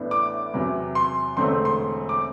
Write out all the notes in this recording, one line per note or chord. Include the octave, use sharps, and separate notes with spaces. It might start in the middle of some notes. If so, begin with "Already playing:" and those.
Already playing: A1 A2 E3 B3 D4
D6
E2 C3 F#3
C6
E1 E2 D3 A3 C4 C6
C6
D6